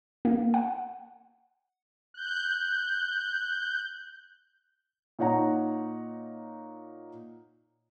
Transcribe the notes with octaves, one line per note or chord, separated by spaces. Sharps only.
A#3
F#5
F#6 G6
A#2 D#4 C#5 F#5 A#5